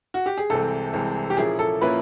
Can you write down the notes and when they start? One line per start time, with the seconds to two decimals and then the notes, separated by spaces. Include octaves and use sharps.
0.14 F#4
0.26 G4
0.37 G#4
0.50 C2 C3 E3 G#3 C4 A4
0.93 C2 C3 E3 G#3 C4
1.30 G4
1.37 A#2 F3 A#3 C#4 E4 G#4
1.59 A4
1.81 A#2 F3 A#3 C#4 E4 B4